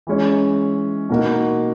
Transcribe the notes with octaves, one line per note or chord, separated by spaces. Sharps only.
E3 G#3 C#4
B2 A#3 D#4 F#4 A#4